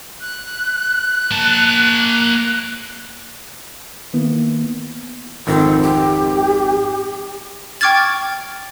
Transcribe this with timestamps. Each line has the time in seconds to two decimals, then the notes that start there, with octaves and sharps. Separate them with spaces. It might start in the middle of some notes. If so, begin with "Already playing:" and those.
0.21 F#6
1.31 A#3 A5
4.14 D#3 A#3 B3 E4
5.47 G#1 F2 D#3 C4
5.82 G4
7.81 G5 C#6 D6 F6 G#6 A6